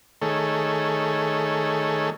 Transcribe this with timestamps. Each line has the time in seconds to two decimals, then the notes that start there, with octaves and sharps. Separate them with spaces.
0.22 D#3 A3 G#4 A4 C#5